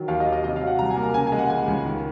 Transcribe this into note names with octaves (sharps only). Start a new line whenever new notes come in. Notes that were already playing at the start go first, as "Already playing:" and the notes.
Already playing: D#3 F#3
D#2 F5
D#5
D#2
D#5
C3 D#5
F5
F#3
F#5
C2 A#5
G#5
A#3
A#5
C#3 G#5
G#5
G#3
F#5
C#2 G#5
C#2
D#3